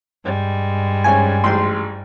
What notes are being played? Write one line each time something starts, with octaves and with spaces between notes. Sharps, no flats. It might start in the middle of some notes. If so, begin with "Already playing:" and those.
G2 G3 G#3
G#2 C#3 C#4 G#5
A1 G#2 G5 C6